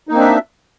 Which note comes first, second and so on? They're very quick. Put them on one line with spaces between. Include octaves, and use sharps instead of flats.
D#4 A#3 C4 D4 E5